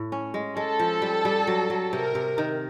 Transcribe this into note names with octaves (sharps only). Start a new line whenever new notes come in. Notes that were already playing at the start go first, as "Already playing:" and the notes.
Already playing: A2
C#4
G#3
G#3 A4
F3
G3
G3
F#3
F#3
C3 A#4
C3
D#3